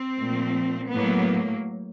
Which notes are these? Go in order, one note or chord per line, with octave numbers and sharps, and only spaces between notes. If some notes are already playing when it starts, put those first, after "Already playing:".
Already playing: C4
A#2 F3 A3
A2 F#3 A#3 B3